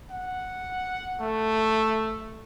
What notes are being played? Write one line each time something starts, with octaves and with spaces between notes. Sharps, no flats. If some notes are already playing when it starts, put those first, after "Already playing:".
F#5
A3